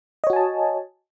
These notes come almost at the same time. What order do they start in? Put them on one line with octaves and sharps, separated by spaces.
D#5 C#5 F#4 G#5 A5